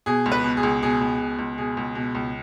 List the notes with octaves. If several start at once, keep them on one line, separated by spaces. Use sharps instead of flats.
B2 G#4
C#2
B4
B2
G#4
C#2
B2 G#4
C#2
B2
C#2
B2 G#4
C#2
B2
C#2